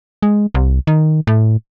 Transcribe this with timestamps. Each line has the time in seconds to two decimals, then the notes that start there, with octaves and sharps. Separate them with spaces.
0.23 G#3
0.55 C2
0.87 D#3
1.27 A2